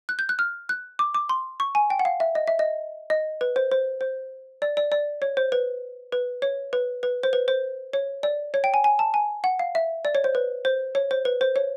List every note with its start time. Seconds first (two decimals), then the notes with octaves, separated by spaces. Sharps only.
0.09 F#6
0.19 G6
0.29 F#6
0.39 F6
0.69 F#6
0.99 D6
1.15 D6
1.29 C6
1.60 C#6
1.75 G#5
1.90 G5
1.99 F#5
2.05 F5
2.20 E5
2.35 D#5
2.47 E5
2.59 D#5
3.10 D#5
3.41 B4
3.56 C5
3.71 C5
4.01 C5
4.62 D5
4.77 D5
4.92 D5
5.22 C#5
5.37 C5
5.52 B4
6.12 B4
6.42 C#5
6.73 B4
7.03 B4
7.23 C5
7.33 B4
7.48 C5
7.93 C#5
8.23 D5
8.54 C#5
8.64 G5
8.74 G#5
8.84 G#5
8.99 A5
9.14 G#5
9.44 F#5
9.59 F5
9.75 E5
10.05 D5
10.15 C#5
10.24 C5
10.35 B4
10.65 C5
10.95 C#5
11.11 C5
11.25 B4
11.41 C5
11.56 C#5